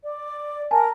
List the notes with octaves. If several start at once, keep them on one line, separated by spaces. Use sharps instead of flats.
D5
A#4 G#5 A5